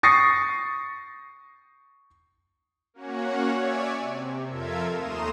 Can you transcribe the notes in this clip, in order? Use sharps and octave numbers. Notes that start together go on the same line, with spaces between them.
C#6 D#6 A6 A#6 C7 C#7
A#3 C#4 F#4 C#5 F#5
C#5 D5 E5 G#5
C3
F2 F4 A4 A#4 E5 G#6
D#2 A3 A#5 C6 D#6 E7